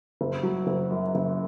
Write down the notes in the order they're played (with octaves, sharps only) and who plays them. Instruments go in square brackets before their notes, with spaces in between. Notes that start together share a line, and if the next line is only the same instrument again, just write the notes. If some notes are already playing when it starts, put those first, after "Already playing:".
[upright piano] F#1
F#3
F#1
F#2
F#1